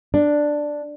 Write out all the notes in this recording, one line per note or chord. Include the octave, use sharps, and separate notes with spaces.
D4